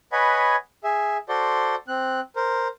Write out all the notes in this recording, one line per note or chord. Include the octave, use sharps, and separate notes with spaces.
B4 C#5 D#5 F#5 G#5 B5
G#4 E5
F#4 A4 C5 D5 C6
C4 F#6
A#4 C5